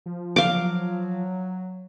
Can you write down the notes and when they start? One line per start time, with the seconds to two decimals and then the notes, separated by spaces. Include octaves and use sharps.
0.06 F3
0.36 F#3 F5 D6